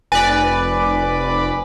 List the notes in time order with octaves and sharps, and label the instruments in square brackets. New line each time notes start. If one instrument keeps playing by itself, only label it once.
[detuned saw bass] F1 [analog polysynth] B4 D5 [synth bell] G#5